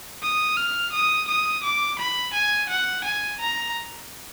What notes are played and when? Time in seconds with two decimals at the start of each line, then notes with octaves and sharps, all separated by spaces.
0.22 D#6
0.57 F6
0.92 D#6
1.28 D#6
1.63 D6
1.99 B5
2.33 G#5
2.70 F#5
3.04 G#5
3.40 A#5